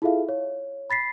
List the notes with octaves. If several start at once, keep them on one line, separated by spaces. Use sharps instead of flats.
E4 F4 G#4 A4 E5 F5
C#5
B5 A6 B6 C7